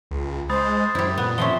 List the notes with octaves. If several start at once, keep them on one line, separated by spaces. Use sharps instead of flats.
C#2
G#3 C5 B5 D#6 A6
F#2 E4 G4
A#2 B3
F3 C4 C#4 E5 G7